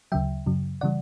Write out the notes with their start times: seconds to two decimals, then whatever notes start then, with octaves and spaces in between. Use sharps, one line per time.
0.12 D2 C#3 F#3 E5 G5
0.46 F#2 C#3 F#3
0.81 C#3 E3 G3 D5 F#5